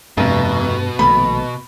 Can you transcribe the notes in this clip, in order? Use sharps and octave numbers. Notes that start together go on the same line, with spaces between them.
F1 G2 B2 G3
A#1 D#3 A3 B5